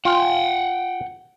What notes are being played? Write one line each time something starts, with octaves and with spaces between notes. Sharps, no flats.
F4 F#5 G5